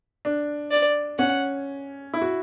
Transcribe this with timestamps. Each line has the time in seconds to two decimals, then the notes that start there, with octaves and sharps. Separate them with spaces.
0.25 D4
0.71 D5
1.19 C#4 F#5
2.14 E4
2.22 F#4